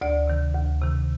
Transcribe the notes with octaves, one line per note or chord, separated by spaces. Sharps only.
D2 D5
C3 D#3
D2
C3 D#3